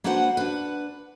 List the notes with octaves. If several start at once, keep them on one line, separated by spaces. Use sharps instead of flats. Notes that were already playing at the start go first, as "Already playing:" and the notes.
A#3 D4 F#4 B4 C5 F#5
D4 B4